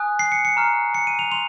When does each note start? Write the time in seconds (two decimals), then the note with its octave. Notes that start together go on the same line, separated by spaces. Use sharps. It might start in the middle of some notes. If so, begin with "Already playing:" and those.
Already playing: G#5 D#6 F#6
0.19 C7
0.32 C#7
0.45 C#7
0.57 A#5 C#6 F6
0.95 C#7
1.07 D#7
1.19 F7
1.32 C6 F7